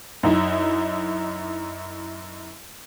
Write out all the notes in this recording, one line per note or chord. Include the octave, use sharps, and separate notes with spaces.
F#2 D#4 E4